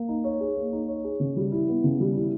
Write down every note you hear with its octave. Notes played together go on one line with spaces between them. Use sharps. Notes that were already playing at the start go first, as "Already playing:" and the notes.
Already playing: A#3
D#4
C#5
G#4
A#3
D#4
C#5
G#4
C#3
G3
E4
B3
C#3
G3
E4